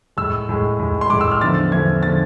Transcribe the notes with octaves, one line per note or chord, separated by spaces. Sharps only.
A2 G#3 E6
A2 G#3
A2 G#3
C6
A2 G#3 D6
E6
F6
E2 D3 F3 A3 A6
E2 D3 F3 A3 G#6
D3 F3 A3 A6